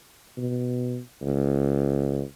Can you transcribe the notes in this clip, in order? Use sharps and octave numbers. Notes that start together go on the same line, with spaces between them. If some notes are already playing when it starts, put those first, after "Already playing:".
B2
C#2